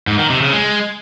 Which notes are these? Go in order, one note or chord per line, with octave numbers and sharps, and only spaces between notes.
G#2
D#3
C3
C#3
G#3